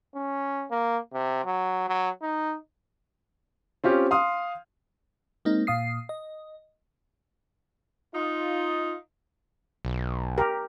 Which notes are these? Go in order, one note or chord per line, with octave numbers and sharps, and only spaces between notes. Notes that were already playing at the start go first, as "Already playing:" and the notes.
C#4
A#3
C3
F#3
F#3
D#4
C4 C#4 F4 G4
F5 C6 D#6
G#3 A#3 C4 D#4
A#2 F5 D#6 C7
D#5
D#4 F4
B1
G4 A#4